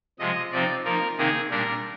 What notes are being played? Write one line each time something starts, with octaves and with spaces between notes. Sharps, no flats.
C3 F3 G#3 D#5
C3 F3 C4 D#4 D5
F3 A#3 D#4 A#4
C3 D#3 A#3 D#4 G#4
A#2 G3 D4 A#4